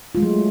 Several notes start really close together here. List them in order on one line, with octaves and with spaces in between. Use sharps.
F4 G#3 A3 F#3